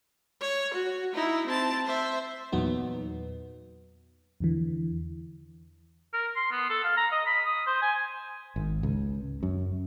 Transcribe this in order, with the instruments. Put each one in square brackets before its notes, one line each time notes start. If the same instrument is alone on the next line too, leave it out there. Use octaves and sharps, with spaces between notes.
[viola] C#5
F#4
D#4 E4
C4 A5
C5 E5
[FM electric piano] E2 A#2 F#3 B3 D#4
E2 D3 E3
[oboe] A#4
C6
B3
A4
F5
A#5
D#5
B5
D#6
C5
G#5
[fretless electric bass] G#1
C#2
F#2